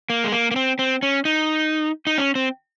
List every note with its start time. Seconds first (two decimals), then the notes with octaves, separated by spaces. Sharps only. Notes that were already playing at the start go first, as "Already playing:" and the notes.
0.10 A#3
0.24 G#3
0.32 A#3
0.51 A#3
0.56 C4
0.79 C4
1.03 C#4
1.25 D#4
2.07 D#4
2.18 C#4
2.35 C4